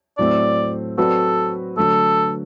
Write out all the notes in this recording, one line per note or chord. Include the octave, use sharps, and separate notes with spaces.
A2 F#3 A3 C4 D5
F#3 C4 F#4 A4 B4 D5
D3 F#3 A3 A4